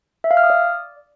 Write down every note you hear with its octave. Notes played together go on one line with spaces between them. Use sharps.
E5
F5
F6
D#6
D5